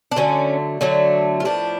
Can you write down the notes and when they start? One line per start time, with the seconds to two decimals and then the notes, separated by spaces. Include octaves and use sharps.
0.12 D4
0.16 D3 F#3 A3 C#4
0.81 D3 F#3 A3
1.40 F4
1.45 A2 F3 B3 D4